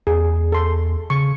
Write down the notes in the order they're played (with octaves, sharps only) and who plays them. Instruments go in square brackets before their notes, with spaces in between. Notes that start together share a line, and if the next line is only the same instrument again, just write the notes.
[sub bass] E2 [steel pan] G#4
[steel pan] A4 C6
[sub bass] C#3 [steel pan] C#6